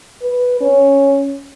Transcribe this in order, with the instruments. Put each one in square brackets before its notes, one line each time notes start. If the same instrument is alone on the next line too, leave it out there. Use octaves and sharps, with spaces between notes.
[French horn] B4
C#4